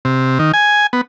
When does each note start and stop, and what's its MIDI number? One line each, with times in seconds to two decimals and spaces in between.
0.05 0.38 48
0.39 0.52 51
0.54 0.87 80
0.93 1.01 59